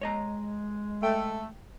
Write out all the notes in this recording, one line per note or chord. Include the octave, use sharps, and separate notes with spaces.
G#3 C#5 D#5 A#5
A3 G5